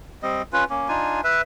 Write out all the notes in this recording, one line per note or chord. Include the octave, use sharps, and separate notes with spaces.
G3 C4 D#5
C#4 F4 B4
A#3 C#4
D4 D#4 F4 G#5
B4 E5